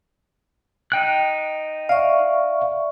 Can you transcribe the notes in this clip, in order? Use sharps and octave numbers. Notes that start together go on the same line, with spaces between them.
D#4 G5 F#6
D5 E5 F5 C#6